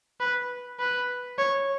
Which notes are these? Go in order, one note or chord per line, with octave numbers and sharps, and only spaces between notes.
B4
B4
C#5